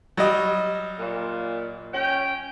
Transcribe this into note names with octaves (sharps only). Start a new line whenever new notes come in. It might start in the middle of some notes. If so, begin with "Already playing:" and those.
F#3 G3 D#5
A#2
C#4 G5